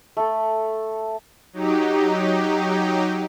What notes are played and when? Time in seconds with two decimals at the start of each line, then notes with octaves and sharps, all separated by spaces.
0.17 A3 A4
1.53 F#3 D#4 G4